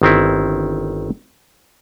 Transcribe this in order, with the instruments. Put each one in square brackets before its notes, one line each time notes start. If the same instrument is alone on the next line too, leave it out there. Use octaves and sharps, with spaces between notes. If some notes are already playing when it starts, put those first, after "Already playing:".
[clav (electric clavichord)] G1 D#3 C4 E4